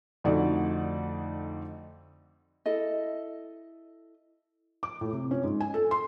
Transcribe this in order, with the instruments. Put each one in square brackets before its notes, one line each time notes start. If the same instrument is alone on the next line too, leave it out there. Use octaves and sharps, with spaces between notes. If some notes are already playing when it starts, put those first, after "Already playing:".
[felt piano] F2 D3 A3 D#4 F#4 D5
[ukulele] E4 A4 D#5
[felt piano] D6
A2
C3
C#4
G#2
G#5
A4
C6